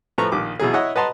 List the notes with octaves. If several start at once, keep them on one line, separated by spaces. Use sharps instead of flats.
A2 F3 B4 A#5 C#6
A#1 D#3 D6
B2 E3 F#3 G#4
E4 C#5 D#5 F#5
B4 D#5 F#5 A5 A#5 C6